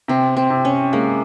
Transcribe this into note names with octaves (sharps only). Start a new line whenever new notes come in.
C3 C4
C4
C3
C#4
G#3 A#3